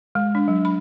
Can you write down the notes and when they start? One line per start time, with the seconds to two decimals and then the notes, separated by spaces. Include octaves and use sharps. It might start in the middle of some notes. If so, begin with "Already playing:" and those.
0.15 G#3
0.35 D4
0.48 F#3
0.65 B5